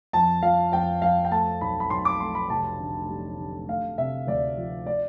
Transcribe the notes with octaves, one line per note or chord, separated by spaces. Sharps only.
F2 A5
F3 F5
F2 G5
F2 F5
G5
A3 A5
B1 B5
B5
B1 C6
D6
A3 C6
B5
F1 A5
D3
G3
D3
A3 F5
C3 E5
D2 D5
F3
D5